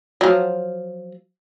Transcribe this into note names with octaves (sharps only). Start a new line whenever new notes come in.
F3 F#3